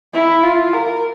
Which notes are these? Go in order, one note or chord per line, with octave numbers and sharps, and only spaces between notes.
E4
F4
A#4